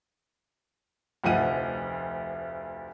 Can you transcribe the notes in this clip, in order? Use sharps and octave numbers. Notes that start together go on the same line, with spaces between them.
F1 D2 F3 F#5 D#7